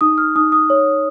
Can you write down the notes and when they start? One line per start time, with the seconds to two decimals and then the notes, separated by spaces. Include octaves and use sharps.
0.01 D#4 D#6
0.18 F6
0.36 D#4 D#6
0.52 D#6
0.70 C#5